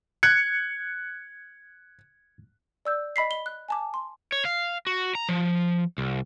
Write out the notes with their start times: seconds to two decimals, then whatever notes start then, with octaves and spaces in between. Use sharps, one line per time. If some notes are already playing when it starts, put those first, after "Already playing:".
0.23 F#6 G#6 C#7
2.85 D5 E6 G6
3.16 D#5 B5 B6 C7
3.31 G7
3.46 F#6
3.69 G#5 A5 D6
3.94 C6
4.32 C#5
4.45 F5
4.87 F#4
5.15 A#5
5.29 F3
5.98 C2